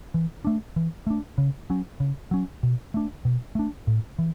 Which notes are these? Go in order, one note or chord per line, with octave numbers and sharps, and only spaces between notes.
E3
A3 D4
E3
A3 D4
C#3
F#3 C#4
C#3
F#3 C#4
B2
A3 D4
B2
A3 D4
A2
E3